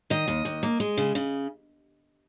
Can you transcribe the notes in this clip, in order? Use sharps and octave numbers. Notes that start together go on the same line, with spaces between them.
D#3 D#5
D#2
D#2
A#3
G#3
C#3
C#3